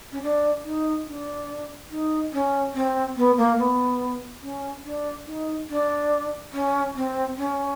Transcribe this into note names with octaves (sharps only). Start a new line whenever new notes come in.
C#4
D4
D#4
D4
D#4
C#4
C4
B3
A#3
B3
C#4
D4
D#4
D4
C#4
C4
C#4